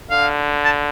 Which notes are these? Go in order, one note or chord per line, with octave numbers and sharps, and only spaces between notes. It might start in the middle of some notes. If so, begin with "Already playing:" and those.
D3 F5
A5